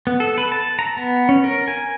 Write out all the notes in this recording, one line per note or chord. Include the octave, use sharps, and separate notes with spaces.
B3
A4
B4
A5
A#5
B3
C#4
A#4
G#5